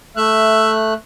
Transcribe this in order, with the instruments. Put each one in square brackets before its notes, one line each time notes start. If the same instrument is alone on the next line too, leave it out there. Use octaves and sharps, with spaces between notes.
[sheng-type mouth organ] A3 F#6 [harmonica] E5